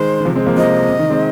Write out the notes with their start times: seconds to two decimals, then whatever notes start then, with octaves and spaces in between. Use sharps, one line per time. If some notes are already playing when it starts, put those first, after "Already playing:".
Already playing: D#3 G#3 C5
0.20 D#3
0.25 C3 F3
0.35 G#3 C4
0.46 F3 A#3
0.57 C3 F3 D#5
0.89 C3
0.99 D#3
1.10 G#3 C4